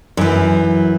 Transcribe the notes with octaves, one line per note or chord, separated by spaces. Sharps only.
F#2 E3